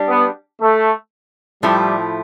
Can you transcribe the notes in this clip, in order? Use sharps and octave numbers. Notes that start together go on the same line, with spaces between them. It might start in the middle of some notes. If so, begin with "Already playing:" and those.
Already playing: G3 D4 G4
B3
A3
A2 F3 G3 A3 E4